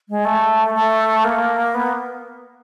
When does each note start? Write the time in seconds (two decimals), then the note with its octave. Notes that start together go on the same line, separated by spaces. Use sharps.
0.09 G#3
0.25 A3
0.74 A3
1.24 A#3
1.74 B3